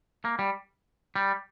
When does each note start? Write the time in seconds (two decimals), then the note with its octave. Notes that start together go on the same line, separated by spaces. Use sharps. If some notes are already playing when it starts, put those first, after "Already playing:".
0.25 A#3
0.39 G3
1.16 G3